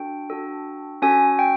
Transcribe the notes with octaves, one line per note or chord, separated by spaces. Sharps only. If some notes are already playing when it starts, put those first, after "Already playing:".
Already playing: D4 F#4 A4 G5
D4 F#4 A4
C#4 F#4 A4 G#5
G5